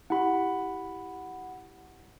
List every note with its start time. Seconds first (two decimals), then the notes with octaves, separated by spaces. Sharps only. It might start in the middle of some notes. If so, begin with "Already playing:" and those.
0.10 E4 G4 F#5 B5